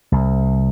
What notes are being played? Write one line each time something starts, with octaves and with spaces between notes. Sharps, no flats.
C2